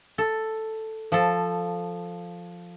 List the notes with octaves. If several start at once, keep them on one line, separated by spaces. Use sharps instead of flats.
A4
F3 A4